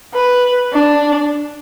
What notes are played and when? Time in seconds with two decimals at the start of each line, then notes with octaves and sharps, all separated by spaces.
0.14 B4
0.73 D4